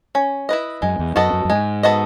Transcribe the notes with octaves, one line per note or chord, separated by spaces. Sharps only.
C#4
E4 B4 D#5
F#2 G#3
E2
F#2 B3 F#4 A4 D#5
F#2
F#2
G#2 G#3
B3 F#4 A4 D#5